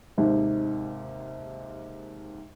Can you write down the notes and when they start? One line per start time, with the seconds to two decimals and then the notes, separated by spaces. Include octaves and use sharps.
0.18 D#2 G#2 C3